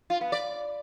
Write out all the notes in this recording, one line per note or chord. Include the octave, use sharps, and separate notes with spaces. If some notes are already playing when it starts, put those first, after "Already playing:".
F4
B3
D5